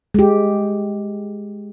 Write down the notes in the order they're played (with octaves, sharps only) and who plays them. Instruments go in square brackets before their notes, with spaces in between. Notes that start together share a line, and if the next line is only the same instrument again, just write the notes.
[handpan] G#3 G4